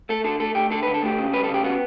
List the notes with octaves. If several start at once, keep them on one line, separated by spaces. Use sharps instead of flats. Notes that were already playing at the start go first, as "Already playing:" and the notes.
A3 A4
D3 A4
A3 A4
A3 G4
D3 A4
B4
D3
A4
A3 G4
C#3
G3 B4
A4
C#3
G4
B3 F#4